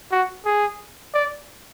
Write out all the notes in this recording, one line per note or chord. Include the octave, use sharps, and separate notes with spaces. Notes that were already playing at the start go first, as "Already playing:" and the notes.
F#4
G#4
D5